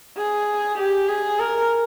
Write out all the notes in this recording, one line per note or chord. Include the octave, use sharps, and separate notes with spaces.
G#4
G4
G#4
A#4